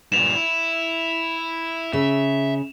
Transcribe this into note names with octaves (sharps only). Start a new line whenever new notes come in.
G2 A#2 E7 F7
E4
C#3 E5